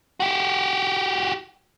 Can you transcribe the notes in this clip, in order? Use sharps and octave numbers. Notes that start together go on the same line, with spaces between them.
F#4 G4